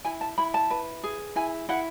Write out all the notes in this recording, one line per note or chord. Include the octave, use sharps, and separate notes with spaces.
E4 G#5
A5
E4 B5
A5
B4
G#4
E4 G#5
E4 F#5